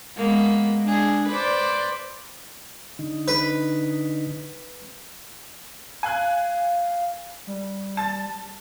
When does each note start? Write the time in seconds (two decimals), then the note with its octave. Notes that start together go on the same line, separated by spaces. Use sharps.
0.15 G#3 A#3 B3
0.83 G#3 D4 G#4
1.28 B4 C5 D5 D6
2.99 D3 D#4
3.28 B4
6.03 F5 G#5 F#6
7.47 G3
7.97 A5 A6